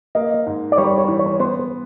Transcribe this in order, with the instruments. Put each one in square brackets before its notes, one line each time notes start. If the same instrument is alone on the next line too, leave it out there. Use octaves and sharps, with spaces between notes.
[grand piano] A#3 [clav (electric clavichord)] D#5
[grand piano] G#2
[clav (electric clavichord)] D5
[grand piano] G3 [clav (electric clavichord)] C#5
[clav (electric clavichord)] C#5
[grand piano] E3
[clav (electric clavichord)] C#5
[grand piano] B3 [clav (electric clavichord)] C5